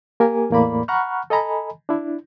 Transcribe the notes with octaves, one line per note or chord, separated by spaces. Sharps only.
A#3 G4 A#4 G#5
E2 A2 A#3 D5 B5
F#5 A#5 B5 C#6 F6 F#6
A4 D#5 G#5 A#5 B5
D4 E4